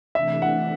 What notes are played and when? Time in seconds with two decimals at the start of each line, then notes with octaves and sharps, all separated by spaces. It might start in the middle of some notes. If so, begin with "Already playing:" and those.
0.15 C3 E3 A3 D4 E5
0.42 F#5